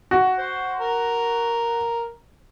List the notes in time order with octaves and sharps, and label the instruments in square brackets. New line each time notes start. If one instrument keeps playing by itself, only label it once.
[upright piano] F#4
[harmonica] C5
A#4